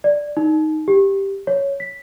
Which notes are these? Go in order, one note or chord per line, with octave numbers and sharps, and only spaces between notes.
D5
D#4
G4
C#5
B6